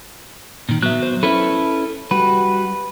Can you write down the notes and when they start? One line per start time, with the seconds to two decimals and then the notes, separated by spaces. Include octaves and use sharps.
0.69 A#2 D#3
0.83 F#3 B3 E5 F#6
1.03 C5
1.23 C#4 E4 A4 B4 E5
2.11 G3 F#4 B4